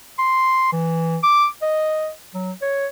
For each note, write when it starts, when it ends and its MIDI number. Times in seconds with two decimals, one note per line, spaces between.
0.19 0.69 84
0.72 1.18 52
1.23 1.47 86
1.62 2.10 75
2.35 2.52 54
2.62 2.87 73